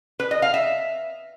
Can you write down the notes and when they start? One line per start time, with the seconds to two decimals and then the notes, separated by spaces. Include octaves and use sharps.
0.20 B4
0.31 D#5
0.42 F5
0.54 E5